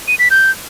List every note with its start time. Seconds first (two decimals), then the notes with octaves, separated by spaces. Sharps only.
0.08 D#7
0.19 B6
0.31 G6